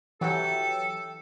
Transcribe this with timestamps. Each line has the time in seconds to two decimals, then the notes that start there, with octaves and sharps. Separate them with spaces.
0.21 E3 F#3 G4 A4 G5